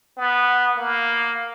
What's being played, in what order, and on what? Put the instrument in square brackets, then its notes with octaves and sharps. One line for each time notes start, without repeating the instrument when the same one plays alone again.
[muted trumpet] B3
A#3